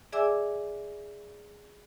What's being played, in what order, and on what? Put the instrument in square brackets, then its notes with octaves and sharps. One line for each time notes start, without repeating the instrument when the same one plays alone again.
[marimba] G#4 D5 E5 G#5 D6 E6